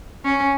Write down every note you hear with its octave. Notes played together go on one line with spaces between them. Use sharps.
C#4